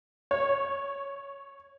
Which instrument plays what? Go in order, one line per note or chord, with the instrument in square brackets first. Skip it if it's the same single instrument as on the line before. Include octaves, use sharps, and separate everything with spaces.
[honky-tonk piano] C#5